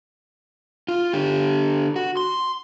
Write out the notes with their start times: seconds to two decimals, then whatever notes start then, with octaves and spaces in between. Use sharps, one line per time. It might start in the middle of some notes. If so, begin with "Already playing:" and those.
0.88 F4
1.13 D3 G4
1.96 F#4
2.17 C6